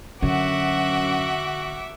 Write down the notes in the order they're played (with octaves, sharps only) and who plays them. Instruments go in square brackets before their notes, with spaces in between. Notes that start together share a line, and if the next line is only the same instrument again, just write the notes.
[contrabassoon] F#2 [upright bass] D3 [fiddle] F#4 [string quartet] E5 F#5 D6